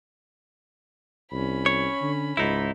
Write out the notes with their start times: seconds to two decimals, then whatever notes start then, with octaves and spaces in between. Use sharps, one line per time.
1.32 C2 C#4 B5
1.66 C#5
2.02 D3
2.37 C#2 G#2 D#4 E4